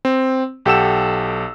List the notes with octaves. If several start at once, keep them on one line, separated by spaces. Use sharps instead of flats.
C4
B1 G4 A4 F#5 E6 E7